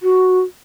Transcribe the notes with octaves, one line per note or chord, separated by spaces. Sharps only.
F#4